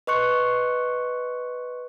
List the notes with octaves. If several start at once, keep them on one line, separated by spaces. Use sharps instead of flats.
B4 D#5 C6 C#6 F#6 C#7